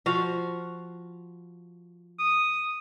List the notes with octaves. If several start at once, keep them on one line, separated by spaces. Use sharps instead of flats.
F3 F#4 F5
D#6